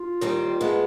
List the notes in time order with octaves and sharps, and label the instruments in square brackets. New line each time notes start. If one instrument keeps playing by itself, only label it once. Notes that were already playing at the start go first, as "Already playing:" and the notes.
Already playing: [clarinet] F4
[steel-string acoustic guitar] D#2 D#3 G3 C4
C3 F3 G#3 B3